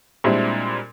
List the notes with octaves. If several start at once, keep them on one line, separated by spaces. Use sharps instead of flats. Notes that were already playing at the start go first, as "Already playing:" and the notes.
A#2 G3 G#3 C4 D4 E4